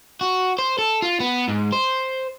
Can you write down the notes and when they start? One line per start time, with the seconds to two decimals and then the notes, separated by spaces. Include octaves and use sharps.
0.21 F#4
0.59 C5
0.78 A4
1.02 F4
1.20 B3
1.48 G#2
1.72 C5